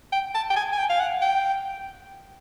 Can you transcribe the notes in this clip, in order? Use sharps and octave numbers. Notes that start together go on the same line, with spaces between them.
G5
A5
G5
G#5
G#5
G5
F5
F#5
G5